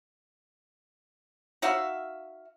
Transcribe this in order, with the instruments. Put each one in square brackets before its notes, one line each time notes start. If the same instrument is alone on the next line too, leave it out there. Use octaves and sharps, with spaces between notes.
[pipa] D#4 F#4 E5 F5